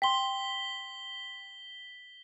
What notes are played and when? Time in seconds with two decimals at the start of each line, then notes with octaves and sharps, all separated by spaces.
0.02 G5 C6 B6 G7